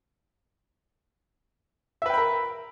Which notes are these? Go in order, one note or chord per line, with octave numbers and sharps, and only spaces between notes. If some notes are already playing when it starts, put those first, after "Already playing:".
A#4 B4 E5 G5 B5